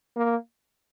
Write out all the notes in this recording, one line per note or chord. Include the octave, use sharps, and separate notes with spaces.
A#3